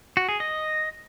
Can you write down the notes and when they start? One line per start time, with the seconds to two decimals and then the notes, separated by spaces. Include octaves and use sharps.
0.17 F#4
0.29 G#4
0.40 D#5